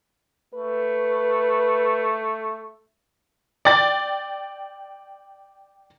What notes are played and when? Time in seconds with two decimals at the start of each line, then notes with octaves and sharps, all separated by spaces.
0.55 A3 B4
3.65 D5 G5 A6